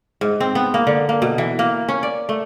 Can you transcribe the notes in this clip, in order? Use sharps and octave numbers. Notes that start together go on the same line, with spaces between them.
G#2
C4
B3
A#3
D3
A#3
B2
E3
A#3
C#4
D5
A3